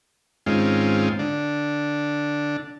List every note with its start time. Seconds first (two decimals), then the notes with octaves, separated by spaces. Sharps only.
0.46 G#2 D#3 G#3 C4 C#4 F4
1.19 D3 D4